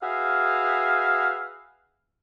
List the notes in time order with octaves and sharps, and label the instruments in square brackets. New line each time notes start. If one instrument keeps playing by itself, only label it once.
[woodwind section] F#4 G#4 B4 E5 F5